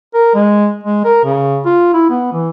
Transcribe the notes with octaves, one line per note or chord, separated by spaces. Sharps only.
A#4
G#3
G#3
A#4
C#3
F4
E4
B3
E3